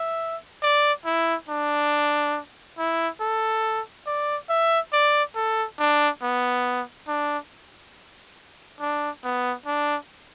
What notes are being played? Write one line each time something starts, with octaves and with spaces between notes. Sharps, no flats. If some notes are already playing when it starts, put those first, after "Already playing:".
Already playing: E5
D5
E4
D4
E4
A4
D5
E5
D5
A4
D4
B3
D4
D4
B3
D4